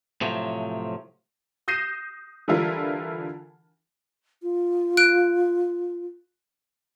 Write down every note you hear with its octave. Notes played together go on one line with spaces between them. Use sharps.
A2 C3 F3 F#3
D#6 G6 A#6 C7 D#7 E7
D3 E3 G3 E4 F4 A#4
F4
F#6 D7